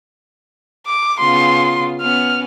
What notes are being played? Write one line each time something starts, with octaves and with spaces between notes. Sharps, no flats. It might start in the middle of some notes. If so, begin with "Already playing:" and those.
D6
C#3 B3 F4 C6
B3 C#4 F6